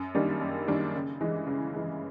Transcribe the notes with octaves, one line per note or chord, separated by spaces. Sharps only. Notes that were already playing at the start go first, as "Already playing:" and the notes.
Already playing: F#2
D#3 G3 A#3 D4
F#2
D#3 G3 A#3 D4
C#3
E3 G#3
C#3
E3 G#3